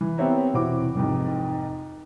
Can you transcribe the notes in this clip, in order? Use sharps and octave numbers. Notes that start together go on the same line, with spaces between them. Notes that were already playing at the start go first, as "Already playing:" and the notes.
E3
B3 C4 G4 C#5 E5 A#5
E1 C3 E4 F#4 C5 D6
F1 F2 G#2